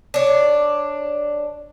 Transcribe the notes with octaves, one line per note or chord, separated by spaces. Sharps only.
D4 C#5